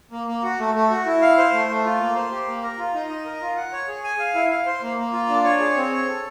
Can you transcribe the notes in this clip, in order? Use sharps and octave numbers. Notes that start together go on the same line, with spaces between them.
A#3
A#3
F#4
A3
A3
F#4
E4
F5
C5
A3
A3
F4
A#3
C5
G4
A#3
A#4
F4
D#4
D#5
A#4
F4
F#5
C#5
G#4
G#5
F5
E4
F5
C5
A#3
A#3
F4
D4
C#5
G#4
C4
C#5
A4